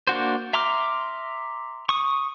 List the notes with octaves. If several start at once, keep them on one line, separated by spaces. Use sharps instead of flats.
A#3 D4 F#4 C5
E5 A#5 C6 D6 F6
C#6 D#6